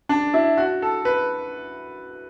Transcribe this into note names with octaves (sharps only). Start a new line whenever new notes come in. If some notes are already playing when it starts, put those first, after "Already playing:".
D4
E4
F#4
A4
B4